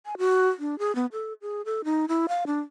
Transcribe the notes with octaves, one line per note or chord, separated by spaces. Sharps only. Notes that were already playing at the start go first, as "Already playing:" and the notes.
G#5
F#4
D4
G#4
B3
A4
G#4
A4
D#4
E4
F5
D4